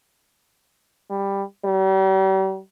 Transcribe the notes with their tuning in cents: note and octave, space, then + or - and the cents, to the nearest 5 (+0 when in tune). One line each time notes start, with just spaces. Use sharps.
G3 +10
G3 -40